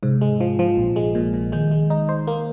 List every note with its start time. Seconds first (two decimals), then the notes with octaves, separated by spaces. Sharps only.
0.03 G#2 C3
0.21 G#3
0.41 F3
0.59 F3
0.77 A#1
0.96 G#3
1.15 A#2
1.34 A#2
1.52 D#3 G#3
1.71 G#3
1.90 D#4
2.09 C5
2.27 A#3